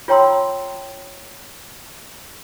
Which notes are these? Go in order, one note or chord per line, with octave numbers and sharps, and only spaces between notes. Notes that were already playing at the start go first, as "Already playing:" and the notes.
F4 C#5 G5 A#5 C6 E6